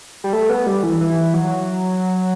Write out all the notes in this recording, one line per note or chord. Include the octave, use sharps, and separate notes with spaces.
G3
A3
B3
G3
E3
E3
F#3